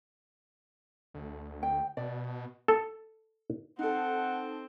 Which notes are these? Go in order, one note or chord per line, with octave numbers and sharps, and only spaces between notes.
D2
G5
B2 D5
A4
C4 D#4 A4 F#5